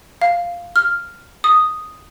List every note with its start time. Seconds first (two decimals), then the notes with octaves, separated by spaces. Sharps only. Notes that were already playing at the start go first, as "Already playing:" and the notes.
0.22 F5
0.76 F6
1.44 D#6